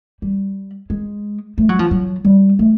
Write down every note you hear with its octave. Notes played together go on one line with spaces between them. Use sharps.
G3
G#3
A3
F#3
F3
F#3
G3
A3